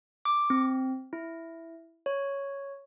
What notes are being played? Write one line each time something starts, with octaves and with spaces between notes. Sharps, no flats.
D6
C4
E4
C#5